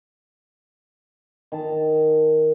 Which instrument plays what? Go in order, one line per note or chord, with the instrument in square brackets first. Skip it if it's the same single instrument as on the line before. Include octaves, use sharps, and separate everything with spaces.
[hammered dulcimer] D#3 A5